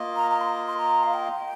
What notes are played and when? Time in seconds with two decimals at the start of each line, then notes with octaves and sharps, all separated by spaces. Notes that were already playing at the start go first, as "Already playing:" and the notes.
Already playing: A#3 F4 D#5
0.16 A#5
0.31 A#5
0.41 C6
0.67 C6
0.77 A#5
1.03 F5
1.14 G5